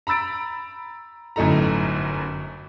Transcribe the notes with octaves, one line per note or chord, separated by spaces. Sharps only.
A#5 B5 E6 A6 D7
G1 F#2 A2 D#4 A4 A#5